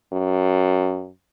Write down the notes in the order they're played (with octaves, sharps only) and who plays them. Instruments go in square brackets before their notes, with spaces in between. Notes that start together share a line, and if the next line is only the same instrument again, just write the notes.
[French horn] F#2